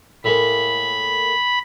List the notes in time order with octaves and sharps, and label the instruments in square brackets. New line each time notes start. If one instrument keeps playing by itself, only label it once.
[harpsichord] A2 G#3 A#3 [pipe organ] B5